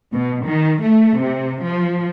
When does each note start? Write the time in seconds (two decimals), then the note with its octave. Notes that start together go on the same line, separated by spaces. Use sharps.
0.13 B2
0.46 D#3
0.82 A3
1.22 C3
1.64 F3